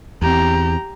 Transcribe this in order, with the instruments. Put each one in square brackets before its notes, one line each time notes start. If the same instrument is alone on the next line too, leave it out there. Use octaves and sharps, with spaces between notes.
[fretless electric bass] E2 C4 [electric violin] G4 A#5